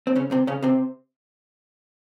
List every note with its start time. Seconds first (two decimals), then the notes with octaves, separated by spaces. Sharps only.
0.07 C4
0.16 C#3 C#4
0.31 C3 C4
0.47 C#3 C#4
0.62 C3 C4